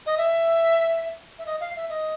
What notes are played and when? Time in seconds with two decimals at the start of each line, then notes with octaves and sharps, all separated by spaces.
0.06 D#5
0.18 E5
1.39 E5
1.46 D#5
1.60 F5
1.76 E5
1.90 D#5